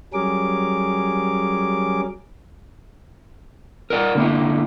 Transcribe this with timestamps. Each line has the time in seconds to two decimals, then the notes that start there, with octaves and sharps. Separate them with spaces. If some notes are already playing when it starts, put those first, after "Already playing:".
0.13 F#3 G3 C#4 G#4 A#4 D6
3.90 A#4 D5 F#5
4.15 D3 A#3 E4